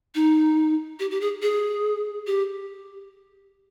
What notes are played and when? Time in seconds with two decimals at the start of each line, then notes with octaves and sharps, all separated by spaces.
0.15 D#4
1.00 G4
1.11 G4
1.21 G#4
1.42 G#4
2.27 G4